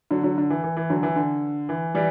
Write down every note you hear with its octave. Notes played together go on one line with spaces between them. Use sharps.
D3 F#3
D3 F#3
D3
E3
E3
E3
D3 F#3
E3
D3
E3
E3 G3